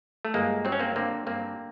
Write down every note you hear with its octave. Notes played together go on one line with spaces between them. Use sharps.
A3
G1 G#3 A#3
F#3 C4
C#4
A#3 C4
D3 A#3 C4
G2 A#3 C4